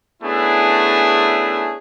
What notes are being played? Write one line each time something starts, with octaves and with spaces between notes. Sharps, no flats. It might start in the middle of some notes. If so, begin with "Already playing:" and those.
A3 B3 C#4 D4 E4 G#4